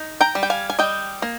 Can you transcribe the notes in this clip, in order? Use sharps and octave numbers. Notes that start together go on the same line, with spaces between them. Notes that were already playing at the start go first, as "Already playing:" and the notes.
Already playing: D#4
G5 A#5
G3
G5
F5 G#5
G#5
G3 D#5 G5
A#3